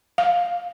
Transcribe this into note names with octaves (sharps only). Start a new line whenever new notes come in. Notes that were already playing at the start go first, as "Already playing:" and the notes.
F5